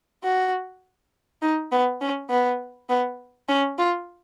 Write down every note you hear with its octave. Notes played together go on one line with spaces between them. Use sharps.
F#4
D#4
B3
C#4
B3
B3
C#4
F4